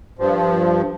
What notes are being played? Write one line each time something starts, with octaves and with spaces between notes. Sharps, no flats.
G2 F3